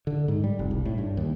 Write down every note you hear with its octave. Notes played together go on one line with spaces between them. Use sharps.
D3
G#2
G3
F1
C2
A2
G2
D#2